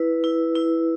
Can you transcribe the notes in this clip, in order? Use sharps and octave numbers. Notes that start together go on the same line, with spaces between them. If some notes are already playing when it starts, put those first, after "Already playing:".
Already playing: E4 B4
E4
E4